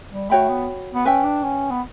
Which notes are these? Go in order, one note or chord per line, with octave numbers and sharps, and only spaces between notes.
G3
A3 F#4 C#5 G5 B5
B3
B3
C#4 B4 E5 G5
D4
C#4
B3